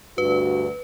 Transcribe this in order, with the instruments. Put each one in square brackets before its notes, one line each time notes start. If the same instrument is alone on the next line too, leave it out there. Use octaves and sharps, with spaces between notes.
[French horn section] D2 G2 F#4 [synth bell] B4